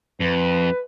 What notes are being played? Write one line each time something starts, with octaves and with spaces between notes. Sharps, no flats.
F2 B4